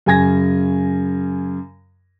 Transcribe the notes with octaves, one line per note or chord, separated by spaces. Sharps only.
F#2 C#3 G#5 G#6 A#6